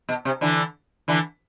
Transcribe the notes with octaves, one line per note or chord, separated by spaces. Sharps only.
B2
C3
D3 E3
D3 E3